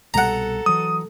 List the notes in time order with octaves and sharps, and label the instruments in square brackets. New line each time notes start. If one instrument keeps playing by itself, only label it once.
[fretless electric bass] C2 B2 G3 [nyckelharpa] A4 [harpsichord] F#5 A#5
[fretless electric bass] E3 F#3 [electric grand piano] D#6